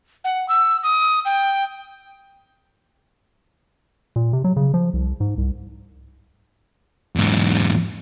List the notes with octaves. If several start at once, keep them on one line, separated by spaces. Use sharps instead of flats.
F#5
E6
D#6
G5
A#2
C3
F#3
C#3
F3
C2
G#2
C2
E2 G#2